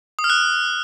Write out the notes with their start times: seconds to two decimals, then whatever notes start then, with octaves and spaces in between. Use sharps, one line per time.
0.19 D#6
0.24 F6
0.30 F#6